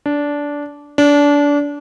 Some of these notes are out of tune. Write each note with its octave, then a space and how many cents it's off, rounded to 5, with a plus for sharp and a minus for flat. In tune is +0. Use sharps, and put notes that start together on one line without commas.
D4 -15
D4 -25